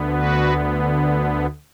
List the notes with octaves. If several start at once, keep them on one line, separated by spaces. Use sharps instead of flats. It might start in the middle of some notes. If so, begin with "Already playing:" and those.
Already playing: D2 D3 B3
F#4 B4